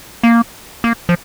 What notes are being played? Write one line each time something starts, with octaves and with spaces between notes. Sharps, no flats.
A#3
A#3
F3